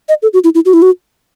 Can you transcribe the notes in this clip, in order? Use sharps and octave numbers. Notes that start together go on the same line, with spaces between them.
D#5
A4
F#4
E4
E4
F#4
E4
F#4